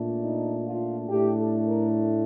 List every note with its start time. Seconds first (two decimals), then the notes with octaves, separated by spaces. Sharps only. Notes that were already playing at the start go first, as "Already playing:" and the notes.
Already playing: A#2 A3 D4
0.23 D#4
0.66 F4
1.09 A2 A3 D4 G4
1.38 A4
1.68 A#4